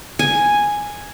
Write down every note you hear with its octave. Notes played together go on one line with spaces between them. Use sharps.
G#5